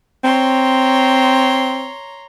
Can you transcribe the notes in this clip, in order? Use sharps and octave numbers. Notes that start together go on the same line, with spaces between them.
C4 C#5 A#5 C6